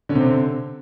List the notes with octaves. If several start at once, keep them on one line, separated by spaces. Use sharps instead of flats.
D3 C#4
C3 C4